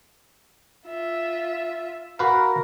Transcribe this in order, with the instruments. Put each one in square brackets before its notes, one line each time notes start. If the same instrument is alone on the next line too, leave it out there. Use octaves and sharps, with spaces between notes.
[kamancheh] F4 E5
[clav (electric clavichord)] F#4 B4 F5 [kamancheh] A#4